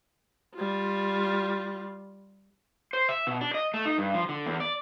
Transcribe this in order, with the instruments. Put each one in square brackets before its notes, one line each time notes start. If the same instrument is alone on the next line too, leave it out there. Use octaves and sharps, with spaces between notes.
[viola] G3 F4
[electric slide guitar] C5
E5
B2
D4
D#5
A3
D#4
G2
F3
D3
E2
D5